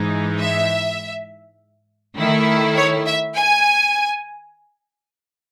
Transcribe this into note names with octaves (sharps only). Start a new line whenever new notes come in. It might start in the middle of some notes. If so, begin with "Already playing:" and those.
Already playing: G#2 E3 G#3 D#4
E5
D#3 A3 E4
C#5
E5
G#5